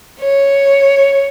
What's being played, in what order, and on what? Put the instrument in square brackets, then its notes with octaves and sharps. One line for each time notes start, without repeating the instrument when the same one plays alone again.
[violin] C#5